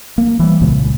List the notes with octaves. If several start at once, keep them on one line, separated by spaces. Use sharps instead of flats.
A#3
E3 G3
C2 A#2 C#3 G#3